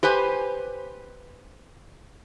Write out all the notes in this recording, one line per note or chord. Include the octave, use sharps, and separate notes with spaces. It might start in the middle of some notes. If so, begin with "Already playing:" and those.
G4 B4 C5 G#5